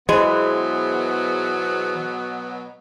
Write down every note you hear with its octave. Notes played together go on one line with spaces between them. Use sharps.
B2 E3 F#3 G#3 B3 G#4 C5